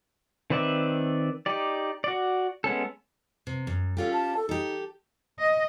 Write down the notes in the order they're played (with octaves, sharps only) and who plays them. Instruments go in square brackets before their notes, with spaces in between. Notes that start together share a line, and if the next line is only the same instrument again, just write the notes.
[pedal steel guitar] D#3 C4 B4 D5 E5
D#4 G4 D5
F#4 D5
G#3 B3 C#4 A4
[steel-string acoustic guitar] C3
F#2
[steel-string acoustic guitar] C#4 F4 G4 [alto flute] A4
[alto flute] A5
A4
[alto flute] D#4 [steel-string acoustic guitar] G4 A4
[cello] D#5